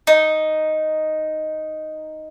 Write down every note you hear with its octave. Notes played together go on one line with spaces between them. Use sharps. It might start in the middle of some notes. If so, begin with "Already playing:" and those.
D#4